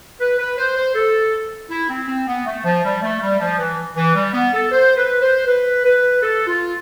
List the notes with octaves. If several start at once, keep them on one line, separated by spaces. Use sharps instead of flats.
B4
B4
C5
C5
A4
E4
C4
C4
B3
A3
F3
G3
A3
G3
F3
E3
E3
G3
B3
A4
C5
B4
C5
B4
B4
A4
F4